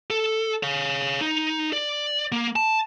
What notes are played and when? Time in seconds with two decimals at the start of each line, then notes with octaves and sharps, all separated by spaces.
0.10 A4
0.63 C#5 F5
1.21 D#4
1.73 D5
2.32 A#3
2.56 A5